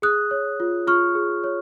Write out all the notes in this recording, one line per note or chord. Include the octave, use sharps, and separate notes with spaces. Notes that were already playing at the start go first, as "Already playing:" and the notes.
G#4 D#6 F#6
C#5
F4
F4 C#6 F6
G#4
C#5